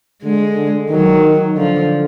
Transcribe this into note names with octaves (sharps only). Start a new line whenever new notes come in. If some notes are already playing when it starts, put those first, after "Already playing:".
D3 G#3
D3
D#3 F#3
D3 F3